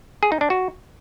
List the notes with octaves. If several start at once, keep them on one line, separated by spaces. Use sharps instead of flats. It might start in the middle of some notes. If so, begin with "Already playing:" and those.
G#4
D#4
D4
F#4